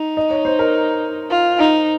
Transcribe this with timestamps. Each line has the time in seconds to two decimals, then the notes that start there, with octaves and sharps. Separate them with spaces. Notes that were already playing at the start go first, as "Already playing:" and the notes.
Already playing: D#4
0.17 D#5
0.31 C#5
0.45 C5
0.59 A#4
1.30 F4
1.58 D#4